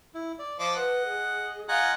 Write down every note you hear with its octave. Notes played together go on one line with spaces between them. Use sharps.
E4
D5
F3 D#5 D6
B4 F#5
G#4
F4 D#5 F5 F#5 G#5 A#5